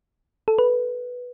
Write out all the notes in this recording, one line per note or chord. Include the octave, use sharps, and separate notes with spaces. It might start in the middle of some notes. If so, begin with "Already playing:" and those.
A4
B4